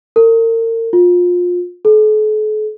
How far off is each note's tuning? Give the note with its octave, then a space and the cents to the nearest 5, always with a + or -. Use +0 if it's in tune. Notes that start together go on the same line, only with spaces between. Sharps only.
A#4 -40
F4 +25
A4 -45